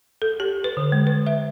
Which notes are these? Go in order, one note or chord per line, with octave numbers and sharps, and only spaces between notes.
A4
G4
B4
D3
G#3
B4
E5